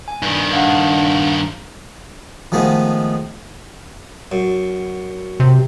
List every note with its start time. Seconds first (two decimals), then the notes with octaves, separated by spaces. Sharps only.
0.08 G#5
0.23 G2 D#3
0.51 D4 F5 F#5
2.52 D#3 F3 G#3 A3 B3
4.32 F#2
5.40 C3